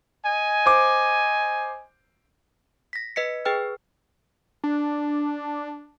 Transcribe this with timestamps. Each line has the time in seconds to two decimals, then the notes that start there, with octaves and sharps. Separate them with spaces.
0.24 D#5 G#5
0.66 C5 D6
2.93 A#6 B6
3.16 B4 D#5 B6 C#7
3.45 G#4 B4 G5 F6
4.64 D4